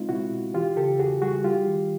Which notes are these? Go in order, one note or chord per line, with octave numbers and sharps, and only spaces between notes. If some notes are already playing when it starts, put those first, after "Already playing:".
Already playing: G#3 C4 D#4 F4
B2 E4 F#4
B2
E3 F4 G4
C#3 G4 A4
E2 F#4 G#4
G3 F#4 G#4
G3 F4 G4
D#3